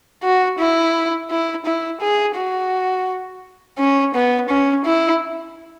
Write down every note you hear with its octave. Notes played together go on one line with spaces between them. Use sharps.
F#4
E4
E4
E4
G#4
F#4
C#4
B3
C#4
E4